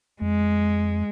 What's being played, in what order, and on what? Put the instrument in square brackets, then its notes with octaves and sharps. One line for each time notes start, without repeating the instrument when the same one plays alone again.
[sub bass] F2 [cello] G#3